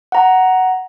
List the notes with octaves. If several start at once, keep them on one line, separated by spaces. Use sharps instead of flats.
F#5 A#5